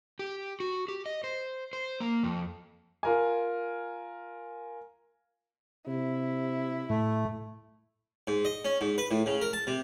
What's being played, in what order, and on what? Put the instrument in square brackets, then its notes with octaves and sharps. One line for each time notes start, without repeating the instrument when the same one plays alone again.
[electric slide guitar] G4
F#4
G4
D#5
C5
C5
A#3
F2
[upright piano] F4 A#4 G#5
[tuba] C3 [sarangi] E4
[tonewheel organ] A2 [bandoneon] A3
[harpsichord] G#2
D#5
C#4
G#2
B4
A2
C#3
A#4
A5
C3